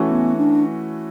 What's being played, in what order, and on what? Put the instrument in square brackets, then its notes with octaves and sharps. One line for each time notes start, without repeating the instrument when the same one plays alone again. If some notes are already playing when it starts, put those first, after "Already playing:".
Already playing: [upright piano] E3 A3 C#4 F#4
[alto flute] B3
D4